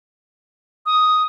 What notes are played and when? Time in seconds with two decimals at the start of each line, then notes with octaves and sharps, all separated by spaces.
0.86 D#6